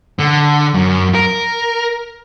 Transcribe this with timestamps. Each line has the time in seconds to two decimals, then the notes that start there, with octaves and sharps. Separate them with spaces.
0.19 D3
0.74 F#2
1.15 A#4